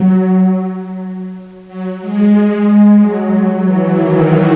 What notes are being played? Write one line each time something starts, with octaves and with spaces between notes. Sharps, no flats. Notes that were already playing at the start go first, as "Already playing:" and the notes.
Already playing: F#3
F#3
G#3
G#3
F#3
E3
D#3